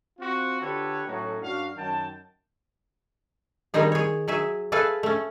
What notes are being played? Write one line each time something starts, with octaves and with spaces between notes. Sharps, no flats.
C4 F4 F#4
D3 F4 G4 A4 B4 C#5
A2 F#3 A3 C#4 D#4 F#4
F#2 D4 F#4 F5
F#2 D#3 F#4 G5 A5
D#3 G3 C4 D#4 G#4
G#4 C#5
F#3 G#4 E5
G#4 A4 B4 E5 F5
A3 C#4